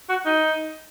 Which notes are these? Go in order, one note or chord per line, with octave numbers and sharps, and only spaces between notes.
F#4
D#4